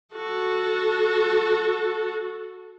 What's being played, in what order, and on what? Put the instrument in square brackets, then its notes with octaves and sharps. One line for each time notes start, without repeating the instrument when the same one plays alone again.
[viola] F#4 A4